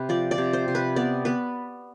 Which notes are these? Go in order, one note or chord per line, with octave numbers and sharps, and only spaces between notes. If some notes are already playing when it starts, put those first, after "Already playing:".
Already playing: C3 B4
F3 D5
D5
C3
C5
C3
B4
B3 D5
B3 B4